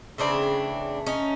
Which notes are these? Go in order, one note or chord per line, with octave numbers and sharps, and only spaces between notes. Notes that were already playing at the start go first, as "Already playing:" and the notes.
C#3 E3 A3 C4 D4
C#4 D#4